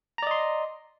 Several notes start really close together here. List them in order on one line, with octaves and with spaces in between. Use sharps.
A#5 D5 D#5 C6